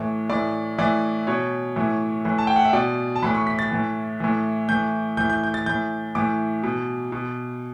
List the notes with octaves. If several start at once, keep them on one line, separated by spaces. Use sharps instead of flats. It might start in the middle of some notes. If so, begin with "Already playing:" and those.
Already playing: A2 E3
A2 E3 D5
A2 E3 D5
B2 C#5
A2 E3
A2 E3
A5
G5
F#5
E5
B2 D5
A5
A2 E3 B5
C#6
B6
A6
A2 E3
A2 E3
A2 E3 G6
A2 E3 G6
G6
G6
A6
A2 E3 G6
A2 E3 D6
B2
B2